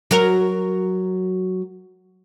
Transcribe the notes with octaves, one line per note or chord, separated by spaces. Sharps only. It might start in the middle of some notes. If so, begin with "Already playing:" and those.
F#3 F#4 A#4